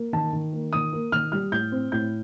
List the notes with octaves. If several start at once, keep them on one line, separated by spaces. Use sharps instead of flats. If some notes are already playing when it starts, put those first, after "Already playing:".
Already playing: A#3
D#3 A5
D#3
A#3
D#3 D#6
A#3
D#3 F6
G3 F6
A2 G6
C4
A2 G6